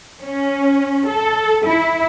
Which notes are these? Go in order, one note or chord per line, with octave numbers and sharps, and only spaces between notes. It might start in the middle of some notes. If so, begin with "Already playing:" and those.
C#4
A4
E4